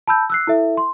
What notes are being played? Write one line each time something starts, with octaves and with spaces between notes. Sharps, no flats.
A5 B5 E6 G6
E6 F#6 C7
E4 A4 E5
C6